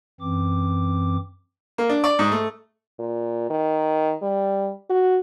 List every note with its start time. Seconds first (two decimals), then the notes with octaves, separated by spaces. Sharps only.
0.21 F#2 E3 C4 D6
1.78 A#3
1.89 D4
2.04 D5
2.19 G#2
2.32 A3
3.00 A#2
3.50 D#3
4.22 G3
4.90 F#4